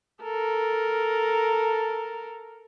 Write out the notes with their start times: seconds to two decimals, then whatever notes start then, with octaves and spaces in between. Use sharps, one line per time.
0.23 A4 A#4